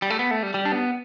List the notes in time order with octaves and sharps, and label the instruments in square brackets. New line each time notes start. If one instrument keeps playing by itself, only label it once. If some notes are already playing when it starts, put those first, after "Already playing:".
[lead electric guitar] G3
A3
B3
A3
G3
G3
D4
B3